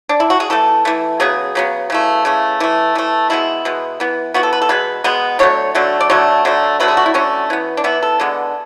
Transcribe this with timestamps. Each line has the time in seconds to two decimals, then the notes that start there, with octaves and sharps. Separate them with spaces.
0.09 D4
0.20 E4
0.30 F#4
0.40 G#4
0.50 E3 A3 A4
0.85 E3 A3
1.20 C#3 F#3 B3 G#4
1.55 C#3 F#3 B3
1.90 C#3 E3 A3
2.25 C#3 E3 A3
2.60 E3 A3
2.95 E3 A3
3.30 B2 G#3 B3 E4
3.65 B2 G#3 B3
4.00 E3 B3
4.34 E3 B3 F#4
4.43 A4
4.53 B4
4.62 A4
4.69 B2 G#3 B3 B4
5.04 B2 G#3 B3
5.39 D3 F#3 A3 C#5
5.75 D3 F#3 A3
6.00 D5
6.10 D3 F#3 A3 C#5
6.45 D3 F#3 A3
6.80 D3 F#3 A3 B4
6.88 G#4
6.97 F#4
7.06 E4
7.14 D3 F#3 A3 C#4
7.50 E3 B3
7.77 D4
7.84 E3 B3 E4
8.03 A4
8.20 D3 G#3 B3